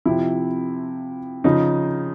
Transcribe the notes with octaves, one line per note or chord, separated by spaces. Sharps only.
C3 F3 E4
C#3 F3 D#4